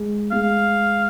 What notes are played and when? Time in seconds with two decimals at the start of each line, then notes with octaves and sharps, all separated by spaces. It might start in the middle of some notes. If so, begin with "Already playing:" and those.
Already playing: G#3
0.32 G#3 F5